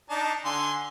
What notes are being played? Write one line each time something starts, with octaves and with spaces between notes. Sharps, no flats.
D4 D#4 A5
D3 G#5 C6